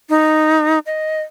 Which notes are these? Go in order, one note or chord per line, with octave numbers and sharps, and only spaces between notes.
D#4
D#5